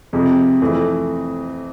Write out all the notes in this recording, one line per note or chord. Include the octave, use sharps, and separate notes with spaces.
F2 C3 G#3
F2 E3 A3